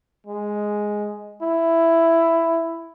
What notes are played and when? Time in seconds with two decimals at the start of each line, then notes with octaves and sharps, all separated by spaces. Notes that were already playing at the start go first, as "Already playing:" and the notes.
0.27 G#3
1.42 E4